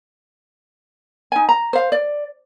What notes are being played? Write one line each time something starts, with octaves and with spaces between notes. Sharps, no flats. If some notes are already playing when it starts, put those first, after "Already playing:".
D#4 G#5
A#5
C5 F5
D5